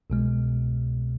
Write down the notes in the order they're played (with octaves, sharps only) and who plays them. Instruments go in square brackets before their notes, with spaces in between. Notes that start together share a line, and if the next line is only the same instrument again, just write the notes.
[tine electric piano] C2 B2 G#3